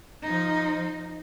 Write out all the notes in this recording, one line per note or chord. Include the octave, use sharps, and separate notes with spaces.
F3 D#4